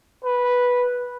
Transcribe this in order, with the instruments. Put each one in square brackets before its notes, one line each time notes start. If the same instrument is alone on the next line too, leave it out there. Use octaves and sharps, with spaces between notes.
[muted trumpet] B4